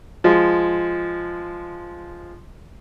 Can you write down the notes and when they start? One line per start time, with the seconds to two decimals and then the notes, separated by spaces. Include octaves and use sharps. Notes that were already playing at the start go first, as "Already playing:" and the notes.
0.24 F3 G#3